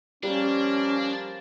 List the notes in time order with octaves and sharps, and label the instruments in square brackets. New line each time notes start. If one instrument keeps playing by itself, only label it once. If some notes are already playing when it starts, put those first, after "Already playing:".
[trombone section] F2 F3 A#3 [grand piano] G3 [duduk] C#4 [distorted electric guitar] D4